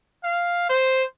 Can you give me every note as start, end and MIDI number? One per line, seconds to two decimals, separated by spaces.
0.24 0.68 77
0.69 1.03 72